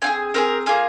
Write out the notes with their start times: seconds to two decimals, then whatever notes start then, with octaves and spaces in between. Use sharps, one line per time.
0.02 C4 F4 G#4 G#5
0.34 C4 F4 G#4 A#4
0.66 A#3 F4 G#4 F5